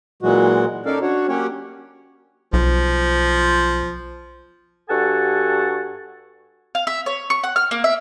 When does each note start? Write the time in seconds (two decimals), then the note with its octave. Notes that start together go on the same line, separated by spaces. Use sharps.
0.23 A#2 E3 F#3 G#3 F#4
0.86 C#4 D#4 A4 A#4 D5 F5
1.02 D4 F#4 C#5
1.28 F#3 A#3 C#4 F#4 G4 C#5
2.53 B1 F3
4.89 G2 F#4 A4 F#5 G#5 A5
6.75 F5
6.87 E5
7.06 C#5
7.30 C#6
7.44 F#5
7.56 F6
7.71 A#3
7.84 E5